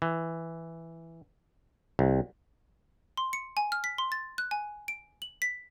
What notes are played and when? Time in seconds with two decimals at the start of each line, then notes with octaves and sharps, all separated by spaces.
0.02 E3
1.99 C2
3.17 C6
3.33 C#7
3.57 G#5
3.72 F6
3.84 B6
3.98 C6
4.12 A6
4.38 F#6
4.51 G#5
4.88 D7
5.22 F#7
5.42 B6